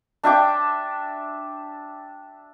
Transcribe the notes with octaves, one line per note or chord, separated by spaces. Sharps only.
D4 E5 G5 D6